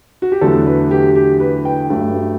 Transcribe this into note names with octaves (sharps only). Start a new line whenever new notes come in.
F#4
G4
E2 D3 F#3 A3 A4
B4
G4
G4
B4
G5
G2 F#3 A3